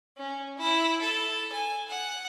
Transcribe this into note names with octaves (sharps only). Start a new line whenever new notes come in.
C#4
E4
A4
G#5
F#5